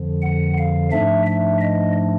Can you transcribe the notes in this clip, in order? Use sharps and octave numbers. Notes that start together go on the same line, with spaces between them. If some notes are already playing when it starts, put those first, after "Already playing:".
Already playing: F2 D3 F3
F#5
F5
G#2 F3 A3 D4 E5
E5
D#5